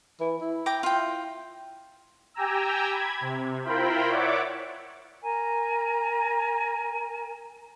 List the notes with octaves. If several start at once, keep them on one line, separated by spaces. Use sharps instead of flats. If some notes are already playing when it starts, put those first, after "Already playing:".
E3
E4
G5 A#5 D6
F4 G5
G4 G5 G#5 A#5 E6
B5 G#6
C3
E4 F4 A#4 C5 G5 B5
C#5 D5 E5 F#5 D6
A#4 G#5 A#5